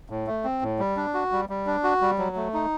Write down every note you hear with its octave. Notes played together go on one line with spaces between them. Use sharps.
A2
A3
C4
A2
G3
D4
F#4
G3
G3
D4
F#4
G3
F#3
A3
D#4